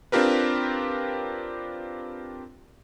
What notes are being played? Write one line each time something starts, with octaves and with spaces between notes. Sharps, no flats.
C4 D4 F4 G4 A#4 B4